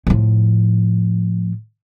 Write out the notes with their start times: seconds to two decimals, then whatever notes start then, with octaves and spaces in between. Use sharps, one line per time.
0.07 A2 F3